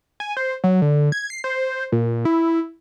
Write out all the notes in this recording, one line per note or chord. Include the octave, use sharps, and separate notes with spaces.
G#5
C5
F#3
D3
G#6
C7
C5
A#2
E4